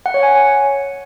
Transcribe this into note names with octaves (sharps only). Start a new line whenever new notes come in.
F#5
C#5
G#5